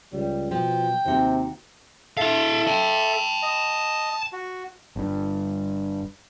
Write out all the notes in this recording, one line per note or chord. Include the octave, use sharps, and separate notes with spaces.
C#2 G3
B2 F3 G5
D#2 C3 C4 F#4 A#4
E4 A4 E5 F5
G5 A5
D#5
F#4
G1 G2